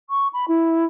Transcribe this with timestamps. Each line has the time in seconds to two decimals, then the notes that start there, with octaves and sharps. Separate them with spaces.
0.10 C#6
0.33 B5
0.48 E4